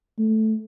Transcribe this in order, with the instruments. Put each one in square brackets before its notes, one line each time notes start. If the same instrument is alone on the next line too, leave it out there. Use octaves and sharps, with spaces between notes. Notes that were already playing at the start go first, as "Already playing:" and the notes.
[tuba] A3